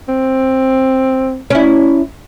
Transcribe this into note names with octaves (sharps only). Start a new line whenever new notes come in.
C4
C#4 E4